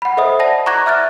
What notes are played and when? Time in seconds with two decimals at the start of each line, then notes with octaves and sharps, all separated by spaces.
0.02 F#5 B5
0.17 A4 C5 D#5 E5 D#6
0.39 D5 F#5 A5 A#6
0.66 A#5 C#6 D6 F#6 G#6 A#6
0.86 E5 F6 F#6 A6